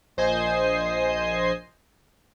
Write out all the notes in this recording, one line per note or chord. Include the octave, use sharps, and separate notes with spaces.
A#1 C5 D#5 G#5 C7